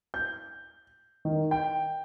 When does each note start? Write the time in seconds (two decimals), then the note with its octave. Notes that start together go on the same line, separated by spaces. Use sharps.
0.14 G6
1.25 D#3
1.51 G5